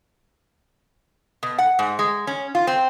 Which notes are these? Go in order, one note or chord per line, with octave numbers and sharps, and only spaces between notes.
B2
F#5
G#2
G#3
C#4
F4
C4